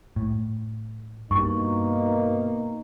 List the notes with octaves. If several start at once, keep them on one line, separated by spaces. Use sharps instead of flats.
A2
G2 B2 A#3 D#4 C#6